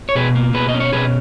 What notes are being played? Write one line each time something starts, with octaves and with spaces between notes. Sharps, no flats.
C#5
B2 G#4 B4
A#3
B2 G#4 B4
D#5
C#4
C#5
B2 G#4 B4